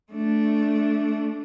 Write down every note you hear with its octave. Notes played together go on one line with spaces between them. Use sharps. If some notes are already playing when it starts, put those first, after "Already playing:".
A3 D4